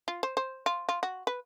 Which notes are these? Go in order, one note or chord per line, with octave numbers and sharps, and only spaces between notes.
F4
C5
C5
F4
F4
F#4
B4